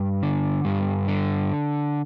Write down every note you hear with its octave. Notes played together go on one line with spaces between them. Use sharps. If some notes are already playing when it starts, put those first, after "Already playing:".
Already playing: G2
D3
G2
D3